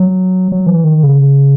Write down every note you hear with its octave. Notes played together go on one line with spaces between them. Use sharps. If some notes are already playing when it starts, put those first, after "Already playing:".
Already playing: F#3
F#3
E3
D#3
C#3